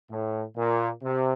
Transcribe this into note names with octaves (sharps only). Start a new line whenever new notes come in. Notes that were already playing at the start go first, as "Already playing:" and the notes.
A2
A#2
C3